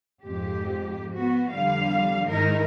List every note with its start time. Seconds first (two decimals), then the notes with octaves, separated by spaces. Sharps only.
0.22 F2 G#2 G4
1.14 B3 F#4
1.53 F2 D3 G3 F5
2.27 G#2 D#3 D#4 E4 A#4